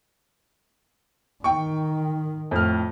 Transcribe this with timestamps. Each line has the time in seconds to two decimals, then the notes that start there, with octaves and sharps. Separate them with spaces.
1.44 D#3 G5 C#6
2.51 F2 A2 F6